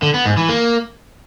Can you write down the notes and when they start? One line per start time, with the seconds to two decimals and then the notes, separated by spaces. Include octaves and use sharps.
0.02 D3
0.14 B3
0.26 G#2
0.37 E3
0.49 A#3